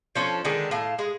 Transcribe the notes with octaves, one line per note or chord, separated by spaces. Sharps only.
F3 C#4 D4 A4
D3 D#3 G#3 D4
A2 F5 A5
G#3